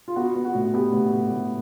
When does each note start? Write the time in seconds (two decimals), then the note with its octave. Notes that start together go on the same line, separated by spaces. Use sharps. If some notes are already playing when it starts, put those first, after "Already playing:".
0.08 F4
0.16 B3 F#4
0.36 B3
0.45 F#4
0.55 A2
0.74 B3 G4
0.93 A2
1.13 A2
1.32 A2